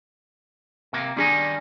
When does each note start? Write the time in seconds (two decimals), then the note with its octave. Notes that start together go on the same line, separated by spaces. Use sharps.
0.93 C3 A#3
1.17 D#3 G3 D4 D#4 G#4